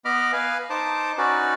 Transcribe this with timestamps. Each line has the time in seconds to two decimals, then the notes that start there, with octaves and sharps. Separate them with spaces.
0.05 B3 D#5 B5 D6 F6
0.33 B4 F5 G#5
0.70 D#4 C5 A5 D6
1.18 C#4 D#4 F#4 B4 D5